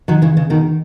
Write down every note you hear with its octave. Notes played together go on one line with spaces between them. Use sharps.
D#3 F#3
C#3 E3
C#3
B2 D#3